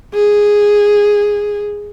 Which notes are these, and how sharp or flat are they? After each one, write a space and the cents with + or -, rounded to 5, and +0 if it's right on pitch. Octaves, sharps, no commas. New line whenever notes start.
G#4 -5